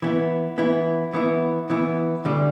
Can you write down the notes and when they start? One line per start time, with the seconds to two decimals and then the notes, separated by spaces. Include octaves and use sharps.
0.02 E3 B3 E4
0.58 E3 B3 E4
1.13 E3 B3 E4
1.70 E3 B3 E4
2.25 D2 D3 G3